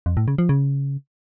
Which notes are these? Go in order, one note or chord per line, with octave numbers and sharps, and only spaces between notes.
F2
A2
C#3
F3
C#3